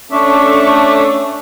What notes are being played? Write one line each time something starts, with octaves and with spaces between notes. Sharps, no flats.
A3 C#4 D4 E5 C#6 D6